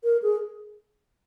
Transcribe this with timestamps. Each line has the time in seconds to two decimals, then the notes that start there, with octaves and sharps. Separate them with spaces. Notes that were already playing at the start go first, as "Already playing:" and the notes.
0.04 A#4
0.22 G#4